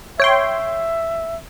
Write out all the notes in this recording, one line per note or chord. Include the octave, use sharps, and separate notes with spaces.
C#5 E5 G5 C6